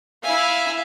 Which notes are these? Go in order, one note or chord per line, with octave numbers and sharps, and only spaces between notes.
E4 E5 F5 G#5